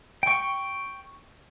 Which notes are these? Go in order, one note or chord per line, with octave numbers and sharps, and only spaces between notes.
G5 C#6